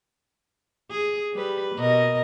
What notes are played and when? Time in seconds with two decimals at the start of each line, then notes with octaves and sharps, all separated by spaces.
0.91 G#4
1.33 G3 B4
1.76 B2 A#4 D#5